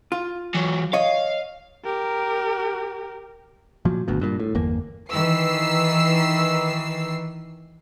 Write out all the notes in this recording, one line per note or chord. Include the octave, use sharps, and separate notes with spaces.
F4
E3 F#3
C#5 D#5 F5
G4 A#4
A#2 F3 F#3
G#1 D2 B2
G2 A#2
A2
G1 E2 A#3
D#3 E3 E6 C7